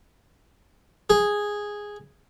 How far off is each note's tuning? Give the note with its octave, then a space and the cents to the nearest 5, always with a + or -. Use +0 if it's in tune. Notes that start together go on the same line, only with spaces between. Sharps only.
G#4 -5